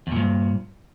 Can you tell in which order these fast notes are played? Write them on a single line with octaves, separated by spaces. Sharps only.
E2 A#2 G2